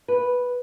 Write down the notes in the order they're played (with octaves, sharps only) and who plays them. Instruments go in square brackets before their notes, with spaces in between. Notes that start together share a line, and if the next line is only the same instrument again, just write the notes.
[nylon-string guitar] B4